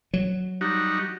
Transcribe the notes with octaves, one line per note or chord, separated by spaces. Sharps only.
F#3
G3 D#4 F#4